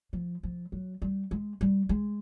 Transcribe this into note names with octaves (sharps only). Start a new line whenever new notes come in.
F3
F3
F#3
G3
G#3
G3
G#3